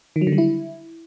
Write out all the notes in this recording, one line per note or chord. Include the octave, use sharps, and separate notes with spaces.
D#3
F#3
D3
G3
E4